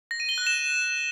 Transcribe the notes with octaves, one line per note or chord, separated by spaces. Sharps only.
A#6
D#7
G7
F#6
E7